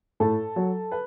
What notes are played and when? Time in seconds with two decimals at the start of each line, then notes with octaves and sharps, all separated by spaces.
0.20 A2 A4
0.56 F#3
0.92 B4